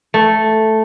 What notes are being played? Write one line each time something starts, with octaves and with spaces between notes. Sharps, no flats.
A3